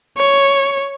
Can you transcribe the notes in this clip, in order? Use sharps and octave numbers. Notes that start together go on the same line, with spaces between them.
C#5